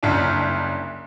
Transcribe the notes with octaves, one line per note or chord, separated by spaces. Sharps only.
F#1 C2 C#4 D4